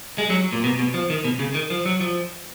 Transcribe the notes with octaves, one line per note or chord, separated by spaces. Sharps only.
G#3
F#3
A#2
B2
B2
F3
D#3
B2
C#3
D#3
F3
F#3
F3